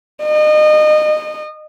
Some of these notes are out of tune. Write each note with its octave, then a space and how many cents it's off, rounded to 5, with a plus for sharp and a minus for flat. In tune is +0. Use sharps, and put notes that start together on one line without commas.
D#5 -30